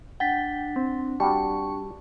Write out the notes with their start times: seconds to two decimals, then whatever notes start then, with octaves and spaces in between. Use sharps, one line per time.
0.20 D4 F#5 G5 A6 B6
0.76 C4
1.20 G3 F#4 A5 C#6